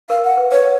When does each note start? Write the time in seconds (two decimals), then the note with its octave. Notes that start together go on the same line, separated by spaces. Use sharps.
0.09 A#4 F5
0.24 F#5
0.37 B4
0.51 B4 C#5